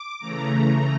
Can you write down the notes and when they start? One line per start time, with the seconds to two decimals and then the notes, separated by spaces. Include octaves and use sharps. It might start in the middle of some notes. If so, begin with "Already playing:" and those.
Already playing: D6
0.19 C#3 E3 A3 A#5